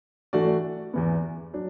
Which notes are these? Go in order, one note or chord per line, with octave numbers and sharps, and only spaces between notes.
E3 A3 D4 F#4 D5
E2 E3 B3
F#3 D4